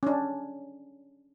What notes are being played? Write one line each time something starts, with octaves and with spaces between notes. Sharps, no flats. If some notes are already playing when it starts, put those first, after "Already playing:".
C#4 D4